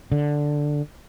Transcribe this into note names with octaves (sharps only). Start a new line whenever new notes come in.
D3